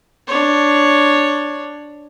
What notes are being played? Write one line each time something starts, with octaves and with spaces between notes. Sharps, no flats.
D4 C#5